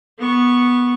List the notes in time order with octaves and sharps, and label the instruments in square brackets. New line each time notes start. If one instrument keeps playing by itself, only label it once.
[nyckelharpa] B3 C#6